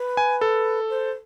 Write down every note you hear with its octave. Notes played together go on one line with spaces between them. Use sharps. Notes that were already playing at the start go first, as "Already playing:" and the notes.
Already playing: B4
G#5
A4
C5